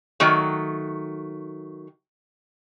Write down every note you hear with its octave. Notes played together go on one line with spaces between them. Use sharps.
D#3 F#3 A3